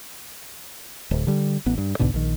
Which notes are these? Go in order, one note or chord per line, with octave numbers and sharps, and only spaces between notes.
D1
D3 G3
A1 B3
G2
B1 G#2 B2 D3
A#1 D#3